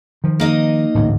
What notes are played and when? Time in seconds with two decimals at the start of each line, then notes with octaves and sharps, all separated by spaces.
0.24 D#3 F3
0.40 A#3 D#4 D#5
0.94 A1 D2 G#2